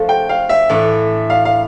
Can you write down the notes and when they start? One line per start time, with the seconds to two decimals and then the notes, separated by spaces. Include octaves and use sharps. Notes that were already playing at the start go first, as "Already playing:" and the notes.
Already playing: F3 A3 D4 F4 C5
0.09 G5
0.29 F5
0.49 E5
0.69 A2 E3 A3 D4
1.30 F5
1.45 F5